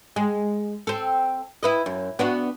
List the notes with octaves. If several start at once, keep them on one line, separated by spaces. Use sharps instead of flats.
G#3
C4 A4
E4 B4 D#5
F#2
B3 D4 F#4